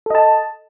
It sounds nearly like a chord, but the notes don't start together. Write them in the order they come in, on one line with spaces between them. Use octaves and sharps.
A4 D#5 A5